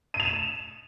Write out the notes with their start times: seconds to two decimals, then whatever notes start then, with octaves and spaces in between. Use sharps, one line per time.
0.14 D#7
0.20 F7
0.25 E7